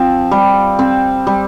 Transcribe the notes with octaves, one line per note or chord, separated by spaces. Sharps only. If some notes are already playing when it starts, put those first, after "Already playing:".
Already playing: F3 C4
G3
C4
G3